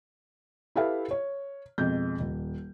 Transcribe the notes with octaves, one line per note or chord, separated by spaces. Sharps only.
E4 G4 A4 B4 E5 F5
C#5
F2 B2 G#3 G6
D#1